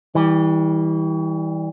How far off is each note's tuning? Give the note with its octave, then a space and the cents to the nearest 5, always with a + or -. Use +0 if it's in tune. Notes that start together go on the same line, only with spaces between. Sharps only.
E3 -35 G3 +0